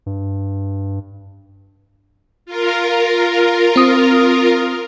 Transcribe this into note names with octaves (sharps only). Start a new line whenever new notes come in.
G2
F4 A#4
C4 D#6